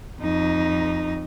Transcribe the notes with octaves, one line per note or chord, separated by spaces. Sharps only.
F2 D#4